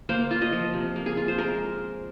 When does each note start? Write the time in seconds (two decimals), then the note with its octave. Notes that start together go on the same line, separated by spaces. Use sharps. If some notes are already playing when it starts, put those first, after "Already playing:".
0.09 A#3 C5
0.31 F4
0.41 D#5
0.52 F3
0.73 C3
0.96 A#3
1.06 G#4
1.17 F4
1.28 C5
1.38 G#3 A#4